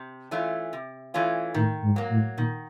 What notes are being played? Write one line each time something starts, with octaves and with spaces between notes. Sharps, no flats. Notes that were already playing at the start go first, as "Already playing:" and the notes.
Already playing: C3
E3 A3 C#4 F4
C3
E3 A3 C#4 F4
A2 D#3
G#2
F#3 A#3
A2
A#2 D#3